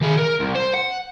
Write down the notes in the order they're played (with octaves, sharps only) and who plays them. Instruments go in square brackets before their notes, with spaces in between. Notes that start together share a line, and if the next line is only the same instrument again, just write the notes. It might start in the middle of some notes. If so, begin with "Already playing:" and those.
[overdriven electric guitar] D#3 G#4
A#4
C2
C5
F#5